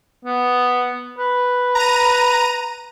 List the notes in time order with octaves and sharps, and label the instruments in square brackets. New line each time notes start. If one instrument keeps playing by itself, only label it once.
[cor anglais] B3
B4
[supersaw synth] A#5 D#7